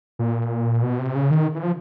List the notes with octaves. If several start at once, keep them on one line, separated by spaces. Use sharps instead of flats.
A#2
B2
C3
C#3
D#3
E3
F3